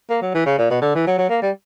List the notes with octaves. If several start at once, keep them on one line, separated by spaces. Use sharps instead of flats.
A#3
F#3
E3
C#3
A#2
B2
D3
E3
F#3
F#3
A#3
G3